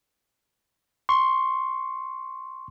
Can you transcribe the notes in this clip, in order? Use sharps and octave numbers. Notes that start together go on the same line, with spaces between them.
C6 C#6